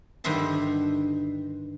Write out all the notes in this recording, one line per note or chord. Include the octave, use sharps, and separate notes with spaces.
G2 D3 D#3 C5 E5 A5